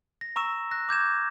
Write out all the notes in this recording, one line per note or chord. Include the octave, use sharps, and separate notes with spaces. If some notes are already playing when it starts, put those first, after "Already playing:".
A#6
A#5 C#6 E6 E7
F#6 A#6
D6 G6 G#6 E7